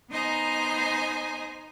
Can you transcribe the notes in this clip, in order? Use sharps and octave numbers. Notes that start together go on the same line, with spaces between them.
B3 D#4 C5 D#5 G#5 A#5